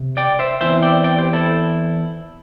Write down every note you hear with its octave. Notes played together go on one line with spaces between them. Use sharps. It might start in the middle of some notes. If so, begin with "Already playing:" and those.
Already playing: C3
D5 G5
C5 E5
E2 E3 C4 C5 E5
D5 G5
D5 G5
G4 C5
E4 A4